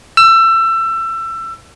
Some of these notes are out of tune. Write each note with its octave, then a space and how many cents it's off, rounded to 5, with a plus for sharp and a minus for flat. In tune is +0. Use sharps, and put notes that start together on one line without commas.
E6 +25